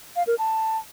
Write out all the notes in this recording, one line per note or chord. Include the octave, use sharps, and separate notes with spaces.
F5
A#4
A5